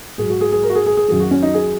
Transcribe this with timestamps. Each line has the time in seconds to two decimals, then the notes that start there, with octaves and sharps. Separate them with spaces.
0.18 G#2 F#3 G#4
0.30 F#4
0.41 G#4
0.52 G#4
0.63 A#4
0.70 F#4
0.75 G#4
0.86 G#4
0.97 G#4
1.08 F#2 D#3 F#3 G#4
1.20 F#4
1.31 C#4
1.43 D#4
1.54 G#4